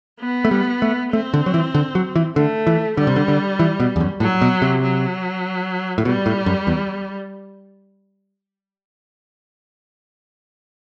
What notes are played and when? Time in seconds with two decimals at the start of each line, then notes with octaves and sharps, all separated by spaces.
0.20 B3
0.45 A3
0.51 G3
0.82 A3
1.13 A3 C4
1.34 D3
1.46 F#3
1.54 E3
1.75 D3
1.95 F#3
2.16 E3
2.36 D3 A3
2.67 E3
2.97 D3 G3
3.07 C3
3.16 D3
3.28 D3
3.59 E3
3.80 B2
3.96 E2
4.00 F#2
4.20 A2 F#3
4.42 B2
4.62 C3
4.82 F#3
5.98 A2
6.05 B2 G3
6.26 A2
6.46 F#2
6.67 E2